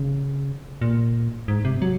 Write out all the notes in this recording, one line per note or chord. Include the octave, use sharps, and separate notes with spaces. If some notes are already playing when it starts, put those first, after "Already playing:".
Already playing: C#3
A#2
G#2
C3
F#3